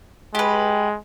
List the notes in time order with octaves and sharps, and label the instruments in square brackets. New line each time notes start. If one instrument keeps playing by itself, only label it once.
[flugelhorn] G#3 [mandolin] G4 B4